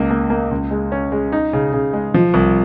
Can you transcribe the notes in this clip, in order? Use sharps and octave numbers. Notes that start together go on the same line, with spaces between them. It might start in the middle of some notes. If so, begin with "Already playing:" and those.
Already playing: C#2 A#3
A#3
A#3
C#2
G#3
C#4
G#3
D#4
C#3
C#3
G#3
F3
C2